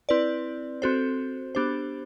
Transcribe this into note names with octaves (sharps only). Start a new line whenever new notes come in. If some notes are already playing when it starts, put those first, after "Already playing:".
C4 E4 B4 D5
C4 F#4 A4 C5
B3 D4 G4 C5